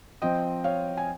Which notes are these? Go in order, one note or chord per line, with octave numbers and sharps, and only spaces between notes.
F3 C4 D#5 G5
C#5 F5
G#5